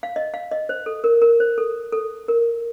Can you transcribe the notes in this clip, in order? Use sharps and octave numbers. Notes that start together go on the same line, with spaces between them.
F5
D#5
F5
D#5
C5
A4
A#4
A#4
C5
A4
A4
A#4